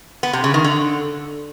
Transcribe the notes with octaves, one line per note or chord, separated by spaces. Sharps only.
B3
C3
C#3
D#3
D3